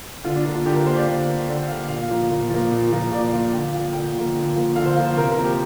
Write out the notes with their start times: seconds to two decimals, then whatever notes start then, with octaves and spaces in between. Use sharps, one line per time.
0.24 D3 F4
0.35 D4
0.45 A#3 F4
0.55 F4
0.65 D3 G4
0.76 A#4
0.85 A#3 C5
0.96 D5
1.07 D3
1.28 A#3
1.47 D3 D5
1.68 A#3 F5
1.88 A#2 F5
2.10 F3 A#3
2.30 A#2
2.50 F3 A#3
2.71 A#2
2.92 F3 A#3
3.11 A#2 D5
3.32 F3 A#3 F5
3.52 D3 G5
3.73 F3 A#3 F5
3.93 D3 G5
4.15 F3 A#3
4.36 D3
4.55 F3 A#3
4.76 D3 F5
4.86 C5
4.96 F3 A#3 F5
5.06 C5
5.17 C3 A#4
5.31 A#4
5.37 F3 A#3
5.44 G4